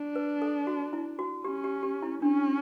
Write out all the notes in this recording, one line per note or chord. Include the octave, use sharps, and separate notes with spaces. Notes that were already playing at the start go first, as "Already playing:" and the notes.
Already playing: D4
B4
A4
F#4
E4
F#4
C#4 G4
G4
G4
E4
C#4 D4